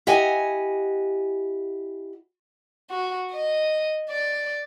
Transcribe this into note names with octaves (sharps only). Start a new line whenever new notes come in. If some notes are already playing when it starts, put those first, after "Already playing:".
E4 G4 D#5 F#5 G#5
F#4
D#5
D5